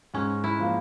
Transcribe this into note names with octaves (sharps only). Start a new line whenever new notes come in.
G#2 C#4
E4
F3 A#3